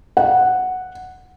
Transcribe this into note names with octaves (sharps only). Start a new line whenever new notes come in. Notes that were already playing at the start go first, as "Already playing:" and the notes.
F#5